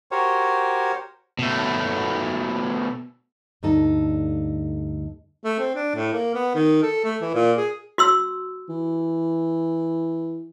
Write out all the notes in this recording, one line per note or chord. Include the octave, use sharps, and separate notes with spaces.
F#4 G4 A#4 C5 C#5
B2 A3
D2 G2 D#4 A4 A5
A3
C4
D4
A2
A#3
B3
D#3
A4
A3
E3
A#2
G#4
F#4 C6 E6
E3